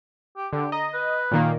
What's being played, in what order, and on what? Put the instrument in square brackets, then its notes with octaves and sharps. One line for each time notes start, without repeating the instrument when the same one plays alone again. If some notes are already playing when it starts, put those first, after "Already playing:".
[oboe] G4
[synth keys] D3 [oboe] G4
[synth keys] D#5 [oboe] A#5
[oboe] B4
[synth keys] A#2 D#3 A#3